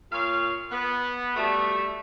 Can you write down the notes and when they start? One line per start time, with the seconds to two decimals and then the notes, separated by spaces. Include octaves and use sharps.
0.12 A#2 C#5 F5
0.71 B3
1.36 B2 G3 A3